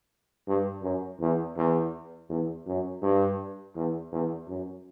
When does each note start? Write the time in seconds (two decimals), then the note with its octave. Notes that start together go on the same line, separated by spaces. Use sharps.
0.47 G2
0.83 F#2
1.20 E2
1.56 E2
2.29 E2
2.66 F#2
3.02 G2
3.75 E2
4.12 E2
4.48 F#2